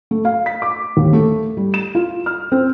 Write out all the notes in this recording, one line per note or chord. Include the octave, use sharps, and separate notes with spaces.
A3
F5
B6
D6
D#2
A3
G3
E7
F4
F6
C4